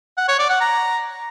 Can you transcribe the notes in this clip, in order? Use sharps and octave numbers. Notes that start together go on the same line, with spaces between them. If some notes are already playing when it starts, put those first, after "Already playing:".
F#5
C#5
D5
F#5
A#5